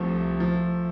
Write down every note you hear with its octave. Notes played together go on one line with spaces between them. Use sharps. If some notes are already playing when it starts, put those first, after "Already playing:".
Already playing: C2 C3 F3 A3 A4
F3